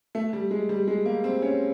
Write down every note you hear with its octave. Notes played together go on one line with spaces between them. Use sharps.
A3
G3
G#3
G3
G#3
A#3
C4
C#4